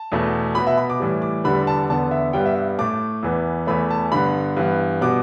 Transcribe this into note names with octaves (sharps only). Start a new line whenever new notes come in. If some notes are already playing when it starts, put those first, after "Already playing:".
Already playing: A5
E2 B2 A3
B2 B3 B5
E5
B5
D6
A2 E3 G3
D6
E2 D3 G3 B3 B5
A5
E2 D3 B3 A5
E5
G2 G3 B3 G5
E5
E5
A2 A3 D6
E2 E3 B3
E2 E3 A3 B5
A5
G2 D3 B3 B5
G2 E3 B3
B2 G3 B3 D6